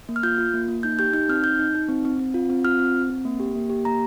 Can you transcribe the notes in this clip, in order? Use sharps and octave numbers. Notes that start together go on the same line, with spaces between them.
A#3
F6
F4 G6
F4
A#3
A#3
D#4 G6
G4 G6
D#4 G6
C4 F6
D#4 G6
D#4
D#4
C4
C4
C4
F4
C4
F4 F6
C4
C4
C4
A#3
G4
A#3
G4
A#3 A#5